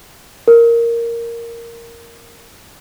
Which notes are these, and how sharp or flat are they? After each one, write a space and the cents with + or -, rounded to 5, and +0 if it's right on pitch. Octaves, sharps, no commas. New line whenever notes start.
A#4 -5